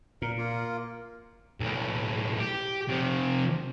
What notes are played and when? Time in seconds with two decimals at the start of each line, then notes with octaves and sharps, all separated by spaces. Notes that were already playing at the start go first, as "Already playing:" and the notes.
0.22 A#2 A#4
0.38 A#3 F4
1.61 B1 A2
2.40 G4
2.89 C3 F3